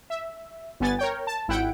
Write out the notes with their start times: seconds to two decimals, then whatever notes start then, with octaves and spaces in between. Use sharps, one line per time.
0.10 E5
0.80 G1 B3 G#5 A6
0.99 A#4 C#5 G5
1.27 A5
1.48 G#1 E4 F#5 G5 D7